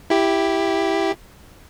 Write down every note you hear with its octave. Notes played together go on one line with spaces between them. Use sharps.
E4 G4